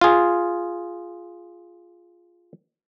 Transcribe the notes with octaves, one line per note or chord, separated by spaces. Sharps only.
F4 G#4